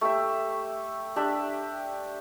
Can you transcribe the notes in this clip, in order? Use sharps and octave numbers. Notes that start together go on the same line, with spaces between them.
A3 G4 E5
D4 G4 E5